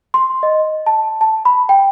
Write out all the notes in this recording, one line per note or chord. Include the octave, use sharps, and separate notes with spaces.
C6
D#5
A5
A5
B5
G5